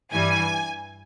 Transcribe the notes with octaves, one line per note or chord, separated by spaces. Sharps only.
G2 E3 G3 G#5